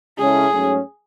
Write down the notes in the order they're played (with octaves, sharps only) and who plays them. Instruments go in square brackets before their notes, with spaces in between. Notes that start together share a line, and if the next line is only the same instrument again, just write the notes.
[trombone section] C#3 G#3 C#4 E4 A4 [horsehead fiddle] G#4
[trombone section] G#2 F#3 A3 C#4